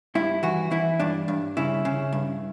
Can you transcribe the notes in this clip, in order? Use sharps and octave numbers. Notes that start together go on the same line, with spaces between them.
G2 E4
E3 F#4
E3 E4
G2 D4
G2
C#3 E4
C#3
G2